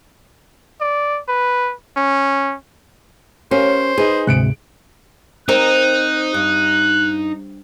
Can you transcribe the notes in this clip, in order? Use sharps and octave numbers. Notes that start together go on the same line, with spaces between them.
D5
B4
C#4
C#4 G4 A#4 C5 F5
D#4 G#4 B4
D2 G#2 C3 F#6 C#7 D7
C4 D#4 A#4 F#6
G2 F#6